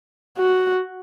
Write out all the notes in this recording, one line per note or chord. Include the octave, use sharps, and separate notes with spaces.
F#4